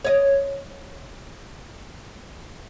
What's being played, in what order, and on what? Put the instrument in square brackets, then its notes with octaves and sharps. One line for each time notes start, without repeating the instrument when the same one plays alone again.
[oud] C#5 D#5